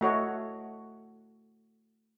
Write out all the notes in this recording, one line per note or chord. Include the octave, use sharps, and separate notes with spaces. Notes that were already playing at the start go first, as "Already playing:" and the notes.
A3 F#4 C#5 D#5